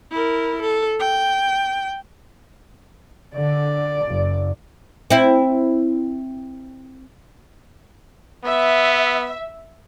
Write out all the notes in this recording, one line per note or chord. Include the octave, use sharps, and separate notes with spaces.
E4 A#4
A4
G5
D3 D5
F#1
C4 E4
B3 E5